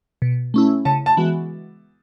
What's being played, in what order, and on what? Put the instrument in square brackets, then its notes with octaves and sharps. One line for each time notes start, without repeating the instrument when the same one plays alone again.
[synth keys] B2
A3 C#4 E4
[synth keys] C#3 [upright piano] A5
[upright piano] A5
[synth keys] E3 G#3 B3 F#4